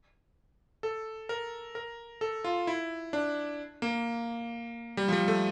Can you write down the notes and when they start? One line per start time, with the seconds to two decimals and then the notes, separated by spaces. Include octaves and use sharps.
0.83 A4
1.29 A#4
1.75 A#4
2.21 A4
2.44 F4
2.67 E4
3.13 D4
3.82 A#3
4.97 G3
5.08 F3
5.13 G3
5.28 A3